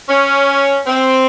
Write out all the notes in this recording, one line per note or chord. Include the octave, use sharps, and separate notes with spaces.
C#4
C4